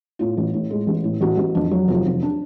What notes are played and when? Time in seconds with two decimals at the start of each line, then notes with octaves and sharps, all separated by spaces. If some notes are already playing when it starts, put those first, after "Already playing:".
0.19 A2 F4
0.37 A1
0.54 A2
0.71 G#3
0.87 A1
1.04 A2
1.21 A1 F#4
1.37 A1
1.55 F2 D4
1.71 F#3
1.88 F1 F4
2.05 F1
2.23 D4